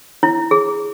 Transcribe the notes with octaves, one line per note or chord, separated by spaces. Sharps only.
E4
G#4